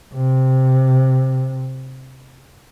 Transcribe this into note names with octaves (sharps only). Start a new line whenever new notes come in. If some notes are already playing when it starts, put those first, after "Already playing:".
C3